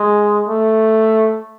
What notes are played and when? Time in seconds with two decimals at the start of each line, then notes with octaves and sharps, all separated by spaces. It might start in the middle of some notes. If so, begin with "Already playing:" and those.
Already playing: G#3
0.49 A3